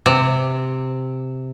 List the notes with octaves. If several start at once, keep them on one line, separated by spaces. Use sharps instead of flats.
C3